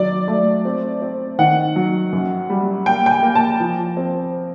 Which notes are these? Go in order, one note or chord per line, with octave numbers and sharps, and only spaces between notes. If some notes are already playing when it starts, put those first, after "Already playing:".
Already playing: D#3 F#3 D5
A3
C4
C4
D#3 F#5
F#3
F#2
G3
A#3 G5
G5
G#5
A#3
A5
F3
C4